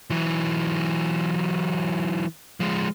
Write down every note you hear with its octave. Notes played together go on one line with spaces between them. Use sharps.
E3 F#3
F3 G#3